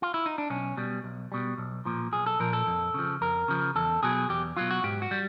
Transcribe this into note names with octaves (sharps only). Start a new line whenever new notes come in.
F4
E4
D#4
D4
B1 C#4
B2 G3
B1
B2 G3
B1
A#2 F3
B1 G#4
A4
A#2 F3 A#4
A4
F2
C#3 F3
F2 A#4
C#3 F3
E2 A4
B2 F#3 G#4
E2 G4
B2 F#3 F4
F#4
G#2 G4
F#4
G3